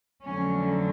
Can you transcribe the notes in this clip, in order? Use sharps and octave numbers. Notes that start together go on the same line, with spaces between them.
F2 D3 F#3 A3 C#4